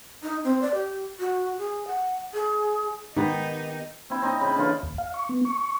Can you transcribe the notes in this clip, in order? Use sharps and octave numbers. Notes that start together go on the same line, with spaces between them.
D#4
C4
D5
G4
F#4
G#4
F#5
G#4
G#2 D#3 B3 D#4 G4
C4 E4
C4 D#4
C#3 B5
D3 E3 F4
D#2
F5
C#6
B3
C#6
C#6